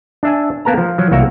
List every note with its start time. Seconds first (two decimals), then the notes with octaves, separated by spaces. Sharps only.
0.23 D4 E5 G#5
0.65 A#3 B3 A#4 A5 A#5
0.78 F3
0.98 F3 F#3
1.11 C2 A#3 F#4 A#4 E5